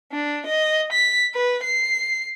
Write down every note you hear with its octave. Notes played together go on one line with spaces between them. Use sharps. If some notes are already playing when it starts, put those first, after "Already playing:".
D4
D#5
B6
B4
C7